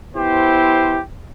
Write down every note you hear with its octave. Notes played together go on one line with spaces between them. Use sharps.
B3 E4 G4 C5